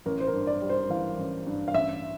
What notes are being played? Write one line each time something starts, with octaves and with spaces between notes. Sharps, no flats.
A1 A#4
C5
A#4
G2
D5
G3
C5
E3 F5
A1
G2
F5
A1 E5